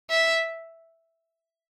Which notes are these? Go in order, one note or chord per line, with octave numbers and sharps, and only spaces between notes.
E5